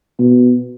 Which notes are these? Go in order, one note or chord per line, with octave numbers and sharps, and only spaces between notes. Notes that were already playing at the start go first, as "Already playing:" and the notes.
B2